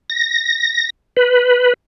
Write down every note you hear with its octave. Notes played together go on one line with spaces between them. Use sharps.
A#6
B4